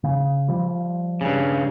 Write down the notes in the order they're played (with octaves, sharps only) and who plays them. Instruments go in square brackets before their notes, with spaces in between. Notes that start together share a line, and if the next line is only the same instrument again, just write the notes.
[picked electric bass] C#3
F3 G3
[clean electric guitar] G2 C#3